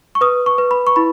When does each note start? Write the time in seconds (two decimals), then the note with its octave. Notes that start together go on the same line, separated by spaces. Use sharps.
0.15 C#6
0.21 B4 D#6
0.46 C#6
0.58 B4
0.71 B5
0.87 C#6
0.96 E4 B5